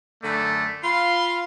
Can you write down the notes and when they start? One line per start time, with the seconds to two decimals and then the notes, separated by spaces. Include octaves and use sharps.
0.23 F#2 D3 A3 D5
0.84 F4 F5 B5 C6